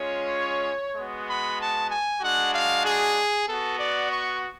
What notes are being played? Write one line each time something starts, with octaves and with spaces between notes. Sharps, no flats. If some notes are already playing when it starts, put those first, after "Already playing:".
Already playing: G#3 C#4 F4 C#5
G#3 B3 F#4
B5
A5
G#5
G#3 D4 F#4 F#5
F5
G#4
B3 F#4 A4
D5
C#6